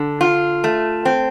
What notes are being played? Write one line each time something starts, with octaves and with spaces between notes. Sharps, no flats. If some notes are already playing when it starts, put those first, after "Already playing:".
Already playing: D3
F4
A3
C4